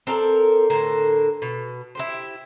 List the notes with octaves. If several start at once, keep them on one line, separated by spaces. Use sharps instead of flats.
C4 A4 A#4 D5
A2 D3 A#4 C5
B2
E4 G4 C5